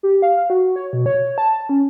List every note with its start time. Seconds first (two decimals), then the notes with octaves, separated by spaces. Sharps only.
0.03 G4
0.22 F5
0.37 F5
0.50 F#4
0.76 C#5
0.93 B2
1.06 C#5
1.38 A5
1.69 C#4